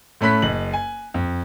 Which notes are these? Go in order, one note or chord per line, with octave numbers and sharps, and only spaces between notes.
A2 A3 C#4 B5 F#6 B6
F#1 D#5 F#7
G#5
F2